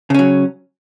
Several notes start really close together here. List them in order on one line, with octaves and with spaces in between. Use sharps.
C#3 C#4 F#3